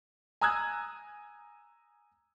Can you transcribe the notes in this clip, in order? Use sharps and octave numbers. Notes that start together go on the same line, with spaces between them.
G#5 A#5 D#6 E6 F#6 G#6